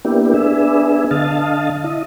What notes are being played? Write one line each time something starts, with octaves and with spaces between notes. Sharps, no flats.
A#3 B3 D4 E4 G4
B3 D4 G#4 E5
D3 D#5 F5 A5
E4 D#5